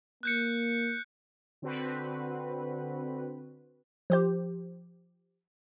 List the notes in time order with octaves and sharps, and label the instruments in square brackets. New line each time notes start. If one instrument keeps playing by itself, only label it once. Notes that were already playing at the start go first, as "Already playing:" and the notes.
[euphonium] A#3 [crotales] F#6 G6 C#7
[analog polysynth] D3 C4 F#4 B4
[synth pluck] F3 G4 C5